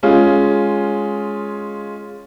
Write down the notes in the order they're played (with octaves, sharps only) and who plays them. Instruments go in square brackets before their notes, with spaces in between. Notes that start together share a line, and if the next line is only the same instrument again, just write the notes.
[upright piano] G#3 C#4 F4